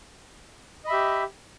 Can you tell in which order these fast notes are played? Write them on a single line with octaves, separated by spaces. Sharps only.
D#5 B5 E5 G4